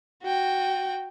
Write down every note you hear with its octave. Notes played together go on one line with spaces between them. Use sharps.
F#4 G5